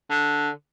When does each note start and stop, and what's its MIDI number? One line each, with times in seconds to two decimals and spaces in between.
0.10 0.50 50